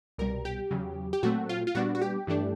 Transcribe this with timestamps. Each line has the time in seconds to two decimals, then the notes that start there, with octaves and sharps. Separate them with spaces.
0.18 C2 B2 G3 A#4
0.45 G4
0.71 E2 C#3 F#3
1.13 G4
1.23 A#2 F#3 A3 C4 F#4
1.49 F4
1.67 F4
1.75 A#2 G3 B3 D4 F#4
1.95 F#4
2.01 G4
2.27 G2 E3 A3 D4